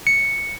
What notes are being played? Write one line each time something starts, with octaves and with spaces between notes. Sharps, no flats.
C#7